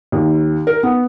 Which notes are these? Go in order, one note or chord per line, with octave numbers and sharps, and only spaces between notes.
D#2
A#4
B3